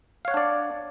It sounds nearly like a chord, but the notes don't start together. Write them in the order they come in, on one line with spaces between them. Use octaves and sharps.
F5 C#5 F#5 D4 D5